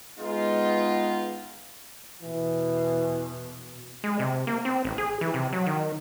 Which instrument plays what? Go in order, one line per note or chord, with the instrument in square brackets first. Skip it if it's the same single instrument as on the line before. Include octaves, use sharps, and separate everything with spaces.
[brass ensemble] G#3 B3 D#4 F4
[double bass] E2 B2 [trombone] E3
[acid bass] G#3
C3
A#3
C4
A1
G#4
E3
C3
F#3
D#3